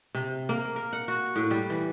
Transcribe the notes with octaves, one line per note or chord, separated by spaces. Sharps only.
C3
A#3
A#4
F#5
F#4
A2
G3
E3